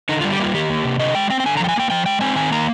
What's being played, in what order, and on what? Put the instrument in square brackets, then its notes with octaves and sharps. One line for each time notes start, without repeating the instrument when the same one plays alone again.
[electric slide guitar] D3 D#4
G3 F4
G4
A#3 F4
D#3 G4
A#3
C3
D3 D#5
G#3 G5
C4 G5
G5
D3 G#5
A#5
F3 G5
G#5
A#3 G5
F3 G5
G#3 G5
C4 G#5
D#3 G#5
A#3 A#5